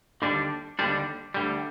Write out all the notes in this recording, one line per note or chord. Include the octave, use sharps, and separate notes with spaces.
D#2 D3 G3 D4
D#2 D3 G3 D4
D2 D3 G3